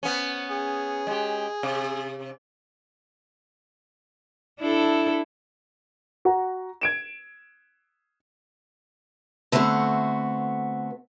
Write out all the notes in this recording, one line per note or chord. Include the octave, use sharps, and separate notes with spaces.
B3 C#4
G#4
G#3 G4
C3
D4 E4 A4
F#4 F#5 A#5
G#6 D7 E7
D3 A3 B3 C4 F#4